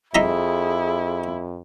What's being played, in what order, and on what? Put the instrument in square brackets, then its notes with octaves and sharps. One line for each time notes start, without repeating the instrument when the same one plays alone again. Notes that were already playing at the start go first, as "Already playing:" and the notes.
[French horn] F2 [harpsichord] D#4 E5 A#5 [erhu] E4 [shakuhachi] G#4